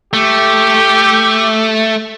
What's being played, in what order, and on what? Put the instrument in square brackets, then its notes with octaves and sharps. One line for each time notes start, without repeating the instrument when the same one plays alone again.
[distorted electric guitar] A3 [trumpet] G4